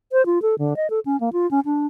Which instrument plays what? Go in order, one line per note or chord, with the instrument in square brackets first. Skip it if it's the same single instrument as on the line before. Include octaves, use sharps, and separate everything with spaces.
[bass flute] C5
F4
A4
D3
D#5
A4
C#4
A#3
F4
C#4
D4